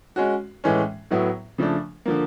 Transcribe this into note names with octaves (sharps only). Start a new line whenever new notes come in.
G#3 C#4 F#4
A2 E3 G#3 C#4
A2 F#3 B3 E4
C#3 F3 A3 D4
D3 F3 A#3